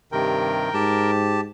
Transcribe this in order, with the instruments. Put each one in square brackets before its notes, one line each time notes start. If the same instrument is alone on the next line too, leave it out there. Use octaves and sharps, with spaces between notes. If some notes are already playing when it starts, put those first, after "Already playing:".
[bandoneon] G2 C3 D#3 [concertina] A#4 G5
[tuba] G#2 [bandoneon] G4 A5